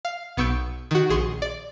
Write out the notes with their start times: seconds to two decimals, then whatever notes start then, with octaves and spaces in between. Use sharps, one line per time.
0.05 F5
0.37 B1 B3 C#6 E6 G6 D7
0.91 D#3 F#4
1.10 A#1 G#4 C6 C#6
1.42 D5